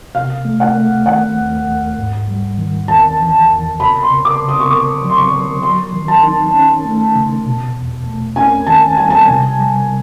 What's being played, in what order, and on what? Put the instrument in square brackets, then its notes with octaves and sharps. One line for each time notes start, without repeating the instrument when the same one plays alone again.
[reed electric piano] C3 [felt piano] F5
[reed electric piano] A3
[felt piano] F#5
[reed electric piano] A3
[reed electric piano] D#3 [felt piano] F#5
[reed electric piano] D#2
D#2
G#2
G3
D#3
[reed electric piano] E2 [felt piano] A5
[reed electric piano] E3
E2
[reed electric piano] C#3 [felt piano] B5
[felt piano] C6
[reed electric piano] C#3
[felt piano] D6
[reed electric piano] C#3
[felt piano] D#6
C#6
[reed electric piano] D3 [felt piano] D6
[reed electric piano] F#3
[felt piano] C6
C#6
[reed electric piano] D3
[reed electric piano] F#3 [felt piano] C6
[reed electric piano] D#3
[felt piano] A5
[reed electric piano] D#4
C#4
A3
C#3
B2
E2
A3
[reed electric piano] C#4 [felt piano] G#5
[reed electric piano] D#3 [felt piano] A5
[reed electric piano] G3 [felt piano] G#5
[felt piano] A5
[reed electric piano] C3 [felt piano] G#5
[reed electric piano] G3